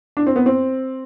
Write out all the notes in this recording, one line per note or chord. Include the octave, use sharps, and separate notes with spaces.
D4
C4
B3
C4